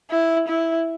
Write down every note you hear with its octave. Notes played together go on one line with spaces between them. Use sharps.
E4
E4